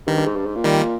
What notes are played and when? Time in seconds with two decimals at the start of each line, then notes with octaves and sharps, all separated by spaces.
0.07 G2 D#3
0.17 G2
0.26 G#2
0.35 G2
0.45 G#2
0.56 A#2
0.64 D#3 G3